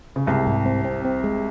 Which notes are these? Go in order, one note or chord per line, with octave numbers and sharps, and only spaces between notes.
C#3
C2 C3 G#3
G#2
C4
C4
C4
G#3